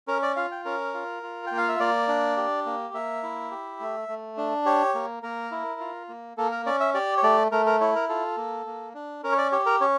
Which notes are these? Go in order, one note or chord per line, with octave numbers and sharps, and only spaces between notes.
C#4 A#4
D5
F4 F5
G5
C#4 A#4
F4
F4
A#3 G5
F5
E5
A#3 D5
D4
G4
A#3
A#3 E5
E4
G4
A3
A3
D4
G4 C#5
A#3
A#3 A#4
E4
F4
A#3
A#3 A4
A#4
C#4 D5
E5
G4 D5
C#5
A3 D5
A3 A#4
A#4
E4 C#5
A#4
F4 A4
A#3
A#3
D4
C#4 A#4
C#5
D5
G4 C#5
A#4
C#4 C#5